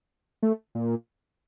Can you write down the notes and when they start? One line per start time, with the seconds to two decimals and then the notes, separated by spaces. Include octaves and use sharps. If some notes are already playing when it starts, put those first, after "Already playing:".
0.43 A3
0.75 A#2